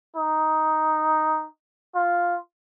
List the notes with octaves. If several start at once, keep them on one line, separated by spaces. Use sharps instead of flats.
D#4
F4